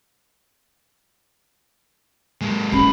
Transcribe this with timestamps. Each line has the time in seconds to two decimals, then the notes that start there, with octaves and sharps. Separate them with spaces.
2.41 G#3 A#3
2.73 C#4 E4 B5